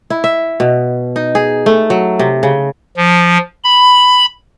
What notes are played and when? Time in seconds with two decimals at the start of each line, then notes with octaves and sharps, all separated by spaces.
0.10 E4
0.24 E5
0.60 B2
1.16 D#4
1.35 G#4
1.66 A3
1.90 F#3
2.19 C3
2.43 C#3
2.97 F3
3.64 B5